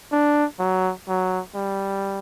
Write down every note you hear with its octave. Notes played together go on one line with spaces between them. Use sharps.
D4
F#3
F#3
G3